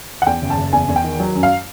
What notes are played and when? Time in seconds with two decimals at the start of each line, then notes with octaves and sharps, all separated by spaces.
0.22 F#5
0.26 E2 G5
0.42 F#1
0.50 A5
0.57 F#1
0.73 E2 G#5
0.89 E2
0.96 G5
1.04 D#3
1.20 F#3
1.35 F#2
1.43 F5